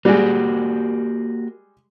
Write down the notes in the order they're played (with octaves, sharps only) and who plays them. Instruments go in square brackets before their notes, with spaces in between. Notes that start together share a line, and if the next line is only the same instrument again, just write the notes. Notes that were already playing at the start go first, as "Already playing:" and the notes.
[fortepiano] G3 G#3 [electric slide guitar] A#3 F#4 G4